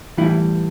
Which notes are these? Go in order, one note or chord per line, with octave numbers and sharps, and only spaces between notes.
A2 E3 G3 E4